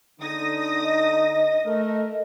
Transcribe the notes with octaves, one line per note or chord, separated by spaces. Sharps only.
D3 D#4 D#6 A#6
D#5
A3 A#4